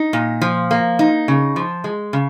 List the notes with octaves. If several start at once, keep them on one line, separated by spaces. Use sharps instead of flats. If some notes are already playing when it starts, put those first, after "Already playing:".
Already playing: D#4
A#2
F3
A#3
D#4
C#3
F3
G#3
C#3